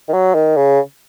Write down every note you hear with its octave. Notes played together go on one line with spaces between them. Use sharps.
D#3
F#3
D#3
C#3